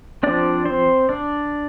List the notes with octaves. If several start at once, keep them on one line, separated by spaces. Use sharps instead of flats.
F3 C4 D4 D5
C4 C5
D4 D5